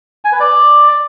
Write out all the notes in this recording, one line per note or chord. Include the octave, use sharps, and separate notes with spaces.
G#5
B4
D5